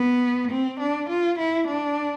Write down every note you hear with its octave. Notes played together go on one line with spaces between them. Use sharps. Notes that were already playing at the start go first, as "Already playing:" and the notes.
Already playing: B3
C4
D4
F4
E4
D4